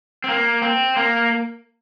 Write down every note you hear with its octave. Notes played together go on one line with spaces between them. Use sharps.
C4
A#3
C4
A#3